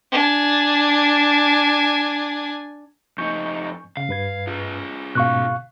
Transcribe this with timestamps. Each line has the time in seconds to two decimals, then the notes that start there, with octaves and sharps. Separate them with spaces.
0.12 D4 G#5
3.18 F2 D#4 G#5 C#6 G6
3.97 C#3 F5
4.09 G2 B4 G#6
4.47 F4 G#4
5.15 G#2 B2 F5 C#6 F#6